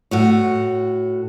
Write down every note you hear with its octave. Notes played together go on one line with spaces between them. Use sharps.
A2 F#4 C#5